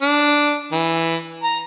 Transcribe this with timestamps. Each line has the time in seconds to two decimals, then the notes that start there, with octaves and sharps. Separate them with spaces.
0.02 D4
0.72 E3
1.43 A#5